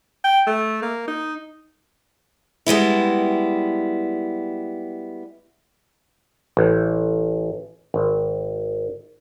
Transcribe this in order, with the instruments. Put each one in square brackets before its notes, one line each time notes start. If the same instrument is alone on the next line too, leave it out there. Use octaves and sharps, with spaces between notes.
[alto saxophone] G5
A3
A#3
D#4
[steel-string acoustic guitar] G3 G#3 B3 E4
[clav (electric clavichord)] A1
G#1